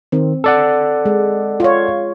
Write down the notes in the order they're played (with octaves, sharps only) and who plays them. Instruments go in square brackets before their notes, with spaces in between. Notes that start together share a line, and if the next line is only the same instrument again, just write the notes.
[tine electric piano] D#3 [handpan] C4
[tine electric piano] A4 D5 F#5
[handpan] G#3
F4 C#5